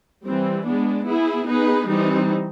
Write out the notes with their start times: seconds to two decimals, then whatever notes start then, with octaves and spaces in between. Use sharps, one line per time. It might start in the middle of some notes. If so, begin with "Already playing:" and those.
0.24 E3 G3 C4
0.65 G#3 B3 D4
1.06 B3 E4 G#4
1.47 B3 D#4 G#4 B4
1.89 E3 G3 C4 D#4